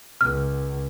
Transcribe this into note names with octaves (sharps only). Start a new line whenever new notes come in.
C#2 F6